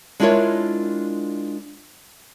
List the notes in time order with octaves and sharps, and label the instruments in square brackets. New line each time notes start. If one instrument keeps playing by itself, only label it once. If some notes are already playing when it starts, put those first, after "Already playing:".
[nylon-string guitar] G#3 D4 E4 F4 A#4 C#5